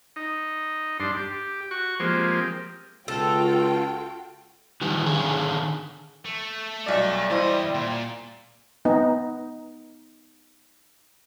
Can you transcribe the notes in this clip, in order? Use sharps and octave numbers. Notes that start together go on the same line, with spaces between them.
D#4
G2 D4 C6
G4
F#4 C#6
F3 G#3 A#3 C4 G4
C#2 F4 F#4 A4 G5
D#3 E3 G3
D3 D#3 G#4
A3
B1 G3 D5
E2 E4 C5 D#5
A#2
B3 D#4